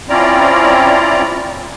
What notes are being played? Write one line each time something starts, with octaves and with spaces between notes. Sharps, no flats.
C4 C#4 E4 F4 D5 A#5